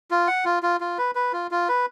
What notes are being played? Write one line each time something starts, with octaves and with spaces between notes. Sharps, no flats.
F4
F#5
F4
F4
F4
B4
B4
F4
F4
B4